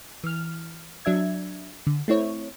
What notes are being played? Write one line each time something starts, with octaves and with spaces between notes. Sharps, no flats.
E3 F6
F#3 D4 E5 G#6
D3
A3 C4 E4 C#5